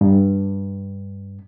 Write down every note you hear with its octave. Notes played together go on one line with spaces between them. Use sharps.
G2